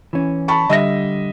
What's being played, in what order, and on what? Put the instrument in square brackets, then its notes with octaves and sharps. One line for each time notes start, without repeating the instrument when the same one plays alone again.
[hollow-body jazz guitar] E3 C#4
[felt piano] A5 B5 C#6
[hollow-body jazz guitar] D3 G3 [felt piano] D#5 E5 A#6